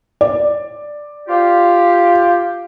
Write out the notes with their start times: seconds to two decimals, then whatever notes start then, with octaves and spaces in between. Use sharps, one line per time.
0.21 D5
1.28 F4 G4